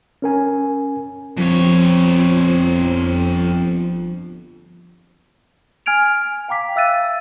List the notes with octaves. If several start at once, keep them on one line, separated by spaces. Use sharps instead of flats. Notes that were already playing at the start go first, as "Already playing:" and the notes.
C#4 A#4 G#5
G1 F2 F3 C4 C#5
G#5 F6 G#6 D7 F7
F5 G5 A#5 D6 B6
E5 F5 E6 F#6 A6 D#7